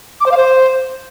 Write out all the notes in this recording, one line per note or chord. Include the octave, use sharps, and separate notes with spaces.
D6
C5
F5
C5